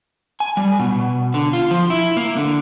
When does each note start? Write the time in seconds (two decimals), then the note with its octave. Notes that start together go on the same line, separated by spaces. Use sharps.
0.40 G#5
0.57 G3
0.79 B2
0.92 B2
1.34 D3
1.53 F4
1.71 F3
1.90 E4
2.17 A#3
2.37 D3